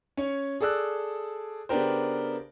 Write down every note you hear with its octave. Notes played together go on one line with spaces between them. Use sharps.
C#4 C#5
G#4 A4 D5 E6 F#6
C#3 B3 D4 G4 A#4 C5